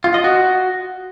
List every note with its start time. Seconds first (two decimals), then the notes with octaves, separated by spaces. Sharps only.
0.04 F4
0.14 D#5
0.24 F#4